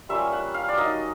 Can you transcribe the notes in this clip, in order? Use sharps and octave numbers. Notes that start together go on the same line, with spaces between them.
G3 A#3 C#4 F4 E5
F#5
F5
D5
F#3 A#3 D#4 D#5